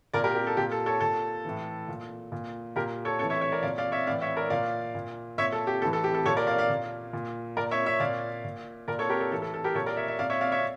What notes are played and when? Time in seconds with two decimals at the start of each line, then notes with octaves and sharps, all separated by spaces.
0.14 A#2 A#4 D5
0.24 G4 A#4
0.35 G4
0.47 A4
0.57 A#2 G4
0.71 A4
0.86 A4 C#5
1.01 A#2 A4
1.45 A2 E3
1.88 A#2
2.32 A#2
2.76 A#2 G4 A#4
3.05 A4 C#5
3.19 A2 A4 C#5
3.23 E3
3.30 C#5 E5
3.41 C#5 E5
3.52 A#4 D5
3.63 A#2 D5 F5
3.78 D5 F5
3.92 C#5 E5
4.07 A2 D5 F5
4.11 E3
4.22 C#5 E5
4.36 A#4 D5
4.50 A#2 D5 F5
4.95 A#2
5.38 A#2 C#5 E5
5.52 A4
5.67 G4
5.82 A2 E3 A4
5.93 A4
6.04 G4
6.15 A4
6.25 A#2 A4 C#5
6.37 A#4 D5
6.47 D5 F5
6.58 D5 F5
6.69 A#2
7.13 A#2
7.57 A#2 A#4 D5
7.71 C#5 E5
7.86 C#5 E5
8.00 A#2 D5 F5
8.44 A#2
8.88 A#2 A#4 D5
8.99 A4 C#5
9.09 G4 A#4
9.21 A4
9.31 E3 A4
9.35 A2
9.42 A4
9.54 A4
9.64 G4 A#4
9.75 A#2 A4 C#5
9.86 A#4 D5
9.97 C#5 E5
10.08 C#5 E5
10.18 A#2 D5 F5
10.30 C#5 E5
10.41 D5 F5
10.52 C#5 E5